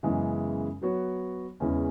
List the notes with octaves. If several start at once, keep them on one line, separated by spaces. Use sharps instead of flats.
F#2 C#3 E3 G#3 B3
F#3 B3 F#4 C#5
E2 C#3 E3 G#3 C#4